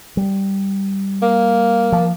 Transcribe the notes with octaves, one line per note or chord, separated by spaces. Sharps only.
G3
A#3
F3